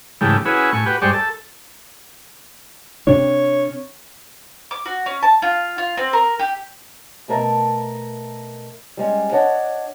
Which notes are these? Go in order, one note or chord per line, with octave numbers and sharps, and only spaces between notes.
G#2 C#3 E3 A3 G4
C#4 E4 F#4 G#4 B4
A2 G#5 C#6
F#4 G4 B4
G2 G#3 G4 C5 D5 C#6
A4
C3 D4 C#5
D6
F#4
C#4
A5
F4
F4
C4
A#4
G4
B2 A3 A#4 E5 A5 A#5
G3 G#3 C#4
D4 C#5 D#5 F#5